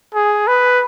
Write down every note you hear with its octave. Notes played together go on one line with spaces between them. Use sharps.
G#4
B4